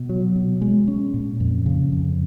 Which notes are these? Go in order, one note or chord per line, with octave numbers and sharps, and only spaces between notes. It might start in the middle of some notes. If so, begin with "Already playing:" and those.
Already playing: B2
F#3
B2
G#3
C#4
A#2
F2
C#3
F2